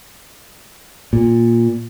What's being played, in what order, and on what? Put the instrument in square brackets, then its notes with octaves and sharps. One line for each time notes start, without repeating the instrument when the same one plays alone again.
[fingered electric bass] A#2